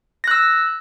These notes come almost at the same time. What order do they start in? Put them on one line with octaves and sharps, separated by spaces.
A#6 F#6 E6